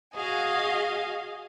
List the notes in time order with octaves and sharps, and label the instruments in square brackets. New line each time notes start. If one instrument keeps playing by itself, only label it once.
[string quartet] F#4 G#4 D#5 F5 G#5